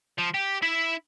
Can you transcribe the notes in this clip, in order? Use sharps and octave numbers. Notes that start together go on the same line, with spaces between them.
F3
G4
E4 E5